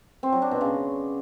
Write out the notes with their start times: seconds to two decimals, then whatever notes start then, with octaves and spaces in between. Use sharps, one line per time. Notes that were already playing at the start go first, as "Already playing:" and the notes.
0.23 C4
0.32 F#3
0.42 D4
0.51 B2
0.61 C#3